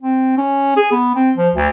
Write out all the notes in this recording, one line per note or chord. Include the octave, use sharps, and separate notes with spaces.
C4
C#4
G#4
B3
C4
F3
D2